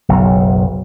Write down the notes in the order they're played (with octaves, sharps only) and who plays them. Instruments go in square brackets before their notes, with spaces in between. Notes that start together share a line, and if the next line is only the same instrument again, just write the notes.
[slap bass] F#1 B1